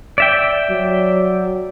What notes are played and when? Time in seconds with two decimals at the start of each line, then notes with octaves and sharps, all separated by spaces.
0.18 D5 E5 G5
0.70 F#3